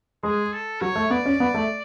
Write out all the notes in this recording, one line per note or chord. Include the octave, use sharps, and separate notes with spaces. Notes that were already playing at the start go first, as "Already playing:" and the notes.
G#3 G#4
A4
F#3 C#5
A3
B3 D5
C#4
B3
A3